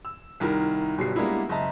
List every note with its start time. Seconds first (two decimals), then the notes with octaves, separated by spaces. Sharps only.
0.05 E6
0.40 C2 D#3 E4 A#4
0.98 G1 B2 F#3 G3 C7
1.16 G3 G#3 A#3 B3 D4 E4
1.49 F#1 D#5 E5 A5 A#5